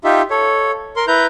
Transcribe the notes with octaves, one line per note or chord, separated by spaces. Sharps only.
D#4 F4 G4 E5
A4 C#5
A#4 C6
E4 B4 A#5 G6